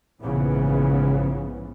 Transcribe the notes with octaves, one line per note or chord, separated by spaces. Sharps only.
A#1 G#2 C#3 E3 F3 B3